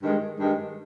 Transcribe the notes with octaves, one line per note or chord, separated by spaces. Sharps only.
G2 D#3 G#3
G2 D#3 G#3